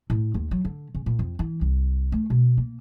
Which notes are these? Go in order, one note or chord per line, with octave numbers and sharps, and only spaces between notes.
A2
D#2
F#3
D3
C#3
A#2
F2
E3
C2
A3
B2
A#3